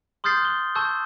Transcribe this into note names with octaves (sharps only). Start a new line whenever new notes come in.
C6 D#6 F6 G6 A6 C7
F#6 G7
A5 C#6 E6 G6